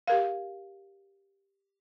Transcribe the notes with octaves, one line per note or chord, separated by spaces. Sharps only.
G4 A#4 F5